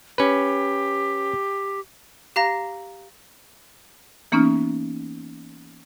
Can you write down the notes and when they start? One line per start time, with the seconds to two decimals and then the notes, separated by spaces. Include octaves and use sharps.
0.18 C#4 G4 B4
2.36 G4 F5 A#5 A#6
4.32 E3 A#3 B3 C#4 D#4 F6